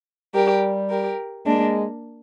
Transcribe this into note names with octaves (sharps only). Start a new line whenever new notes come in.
G3 G4 A#4
G4 A#4
G#3 A#3 D4